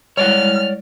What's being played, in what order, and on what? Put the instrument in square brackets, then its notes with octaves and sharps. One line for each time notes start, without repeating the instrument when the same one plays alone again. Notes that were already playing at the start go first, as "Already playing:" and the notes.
[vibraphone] G3 G#3 E4 [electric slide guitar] C#5 D5 F#5 [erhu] F6